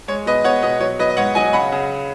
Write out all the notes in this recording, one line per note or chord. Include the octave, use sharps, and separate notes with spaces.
G#3 C#5
B2 B4 D#5
B2 C#5 F#5
B2 B4 D#5
F#3 C#5
F#3 B4 D#5
D#5
G#2 C#5 F#5
F#3 D#5 G#5
C#3 F#5 B5
C#3